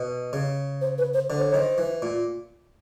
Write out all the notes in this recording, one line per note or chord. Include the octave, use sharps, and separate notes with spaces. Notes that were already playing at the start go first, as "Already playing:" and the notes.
Already playing: B2
C#3
C5
B4
C5
D3 C5
C#5
D#3 C5
E3
A#2